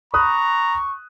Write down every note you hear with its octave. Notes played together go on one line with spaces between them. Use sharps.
A#5 B5 C#6 D#6 F#6